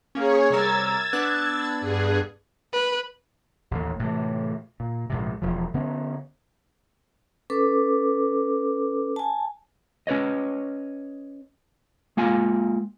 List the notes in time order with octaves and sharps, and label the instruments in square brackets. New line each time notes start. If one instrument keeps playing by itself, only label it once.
[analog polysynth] A#3 C#4 [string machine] G#4 C#5
[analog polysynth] C3 G3 A#4 [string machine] E6 G#6 A6
[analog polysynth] B3 D4 F#6
[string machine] G2 G#4
[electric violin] B4
[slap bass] A1 D#2
A2 C3 E3
A#2
A#1 G#2 C3
E1 F3
D3 B3 C#4
[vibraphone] C#4 A4 B4 D6
G#5 A5
[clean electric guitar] C#4 B4 C#5 D#5
G#3 A#3 F4 G#5